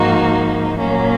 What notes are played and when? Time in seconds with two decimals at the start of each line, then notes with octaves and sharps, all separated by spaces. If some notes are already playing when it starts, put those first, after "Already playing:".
Already playing: G#2 F3 A#3 D#4 F#4
0.77 A#2 F#3 A#3 C#4